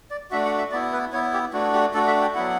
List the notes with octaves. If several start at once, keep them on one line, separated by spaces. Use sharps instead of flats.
D5
A3 D4 F#4 E5
F#5
E5
B3 E4 D5
B4
B3 E4 C#5
G4
A3 D4 F#4
G4
A3 D4 F#4 A4
E5
G5
F#3 B3 E4 F#5